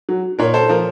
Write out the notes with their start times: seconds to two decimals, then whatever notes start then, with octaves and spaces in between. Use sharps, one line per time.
0.09 F#3
0.39 A#2 A#4 C#5
0.54 A4 C5
0.69 F3 A#4